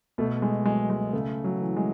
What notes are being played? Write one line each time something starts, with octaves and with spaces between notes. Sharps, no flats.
B2 A3
G#3
F#3 G#3
G#3
C#3 A3
F#3
E3
G#3